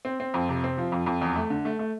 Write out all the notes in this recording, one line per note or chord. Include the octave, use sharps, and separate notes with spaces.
C4
C4
F2
C3
C4
F3
F2
F2
E2
A3
D3
A3
A3